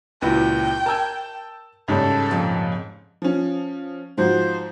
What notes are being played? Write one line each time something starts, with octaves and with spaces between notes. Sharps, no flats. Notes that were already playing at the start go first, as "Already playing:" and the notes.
C#2 A#2 E4 F#4 B4 G5
A#4 G#5 A5 E6
G#2 C#3 G3 C#4 A4
F2 A#2
F3 C#4
G#2 F3 F#4 C5